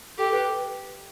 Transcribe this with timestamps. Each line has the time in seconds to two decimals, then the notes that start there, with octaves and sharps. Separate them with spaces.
0.18 G4 A4
0.32 B4